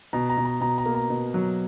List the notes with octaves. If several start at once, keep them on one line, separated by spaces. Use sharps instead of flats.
B2 A#5
A#5
B2
A#5
B2 A#5
A#5
A#3
A#5
B2
F#3